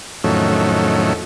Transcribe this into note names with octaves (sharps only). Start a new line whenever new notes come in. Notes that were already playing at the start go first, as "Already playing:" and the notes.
F2 A2 D#3 F#3 A3 C#4